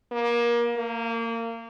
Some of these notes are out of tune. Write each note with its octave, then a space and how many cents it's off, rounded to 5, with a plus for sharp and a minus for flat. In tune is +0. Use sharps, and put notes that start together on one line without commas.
A#3 +25
A#3 -25